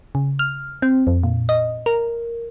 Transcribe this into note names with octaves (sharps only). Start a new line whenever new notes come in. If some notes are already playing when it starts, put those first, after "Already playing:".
C#3
F6
C4
F2
A#2
D#5
A#4